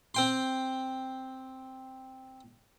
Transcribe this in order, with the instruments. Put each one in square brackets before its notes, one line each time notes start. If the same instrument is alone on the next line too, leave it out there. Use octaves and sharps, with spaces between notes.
[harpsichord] C4 G5 C6